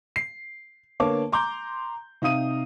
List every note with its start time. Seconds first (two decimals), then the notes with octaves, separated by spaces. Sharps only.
0.16 C7
1.00 D3 A#3 B3 C#5 A5 D6
1.32 A#5 C6 D6 G6
2.22 C3 D#4 F5 D#6 D#7